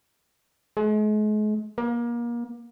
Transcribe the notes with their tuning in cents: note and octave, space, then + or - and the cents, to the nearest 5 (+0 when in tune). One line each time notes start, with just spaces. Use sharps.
G#3 +40
A#3 +30